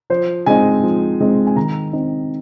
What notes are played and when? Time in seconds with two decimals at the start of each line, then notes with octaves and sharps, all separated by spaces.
0.10 F3 C5
0.46 G#3 C4 D#4 G#5
0.83 F3
1.21 G#3 C4 D#4
1.47 G#5
1.56 D#3 A#5
1.93 C4 D#4